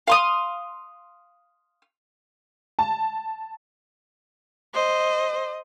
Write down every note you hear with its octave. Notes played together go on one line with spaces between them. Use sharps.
F5 C6 D#6
A5
C5 D#5